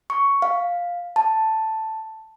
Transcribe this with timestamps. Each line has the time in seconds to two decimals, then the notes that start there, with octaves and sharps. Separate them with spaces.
0.10 C#6
0.42 F5
1.16 A5